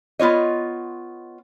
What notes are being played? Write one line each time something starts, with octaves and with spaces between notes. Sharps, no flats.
B3 F4 C#5 D#5